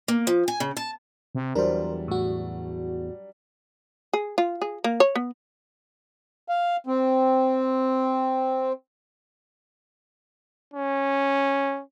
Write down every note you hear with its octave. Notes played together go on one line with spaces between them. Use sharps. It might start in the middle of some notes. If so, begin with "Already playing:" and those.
A#3
F3
G#5
C#3
A5
C3
E2 F#3 G3 D4 A#4 C5
A2 F#4
G#4
F4
G#4
A#3
C#5
B3
F5
C4
C#4